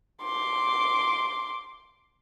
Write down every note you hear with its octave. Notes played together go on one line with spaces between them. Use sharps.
C6 D6